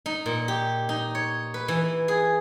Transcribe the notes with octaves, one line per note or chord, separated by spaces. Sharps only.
D#4
A#2
G4
D#4
C#5
B4
E3
G#4